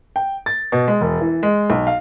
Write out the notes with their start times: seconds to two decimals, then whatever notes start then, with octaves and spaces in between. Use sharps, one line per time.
0.16 G5
0.46 A6
0.72 B2
0.88 G#3
1.01 E1
1.21 E3
1.43 G#3
1.70 B1
1.87 F5